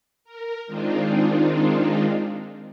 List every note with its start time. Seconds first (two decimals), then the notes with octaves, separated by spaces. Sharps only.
0.24 A#4
0.67 D#3 G#3 C4 D4 D#4 F4